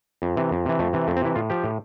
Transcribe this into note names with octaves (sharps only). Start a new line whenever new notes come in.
F2
C3 E3
F2
C3 E3
F2 A3
C3 E3
F2 A3
C4
C3 E3 E4
A2 F4
F3 G4
A2